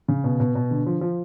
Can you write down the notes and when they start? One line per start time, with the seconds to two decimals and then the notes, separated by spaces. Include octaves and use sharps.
0.08 C#3
0.24 B2
0.40 B2
0.55 B2
0.71 D3
0.87 F3
1.01 F3